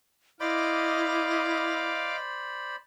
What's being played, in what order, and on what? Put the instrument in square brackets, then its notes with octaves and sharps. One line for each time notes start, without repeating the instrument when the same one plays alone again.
[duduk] E4 [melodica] C5 D5 B5 [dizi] D#5 [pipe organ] F5 D6